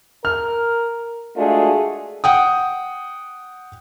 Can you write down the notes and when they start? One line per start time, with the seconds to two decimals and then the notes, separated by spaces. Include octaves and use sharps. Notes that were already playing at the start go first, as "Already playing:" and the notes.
0.25 A#4 F6
1.36 G#3 A3 D4 F4 F#4 G#4
2.24 F#5 G5 D#6